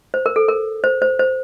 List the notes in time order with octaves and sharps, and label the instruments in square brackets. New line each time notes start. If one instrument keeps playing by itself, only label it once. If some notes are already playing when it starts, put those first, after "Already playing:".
[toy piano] C5
A#4
A4
A#4
C5
C5
C5